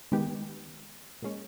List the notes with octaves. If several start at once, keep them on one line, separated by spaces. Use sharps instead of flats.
D#3 G#3 B3 G4
A#2 G#3 C#4